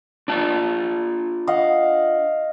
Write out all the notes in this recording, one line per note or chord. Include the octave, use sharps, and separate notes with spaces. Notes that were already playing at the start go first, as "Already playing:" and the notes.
D4 F4 A5
D#5 F5 F#5